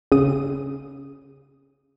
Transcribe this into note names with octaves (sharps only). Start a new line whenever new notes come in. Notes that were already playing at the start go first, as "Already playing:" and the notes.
C#3 D#6